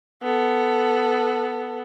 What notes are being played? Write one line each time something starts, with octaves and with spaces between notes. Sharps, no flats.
B3 A4